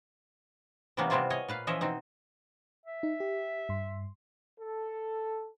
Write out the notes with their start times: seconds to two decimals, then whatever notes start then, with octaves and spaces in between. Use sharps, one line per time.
0.97 C3 E3 G3 A#3 B3 C#4
1.10 C3 G3 B3 C4 E4 F4
1.30 C#5 D#5 G#5
1.48 A#2 B4 F5
1.67 E3 F3 C#4 D#5 E5
1.81 B2 C4 D#4
2.86 E5
3.03 D#4
3.20 G4
3.69 G2 C6
4.60 A4